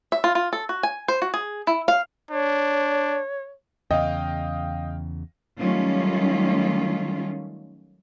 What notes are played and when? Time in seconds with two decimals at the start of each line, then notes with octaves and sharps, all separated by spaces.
0.12 E5
0.24 F4
0.35 F4
0.53 A4
0.69 F#4
0.83 G#5
1.08 C5
1.22 F#4
1.34 G#4
1.67 E4
1.88 F5
2.31 D4 C#5
3.91 E2 C#3 D#5 F5 G5
5.59 D#3 F#3 G3 A3 C#4 F4